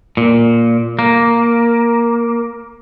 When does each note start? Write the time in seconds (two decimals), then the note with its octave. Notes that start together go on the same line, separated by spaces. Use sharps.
0.17 A#2
0.99 A#3